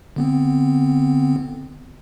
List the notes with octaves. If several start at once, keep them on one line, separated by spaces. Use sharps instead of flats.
D3 B3 C4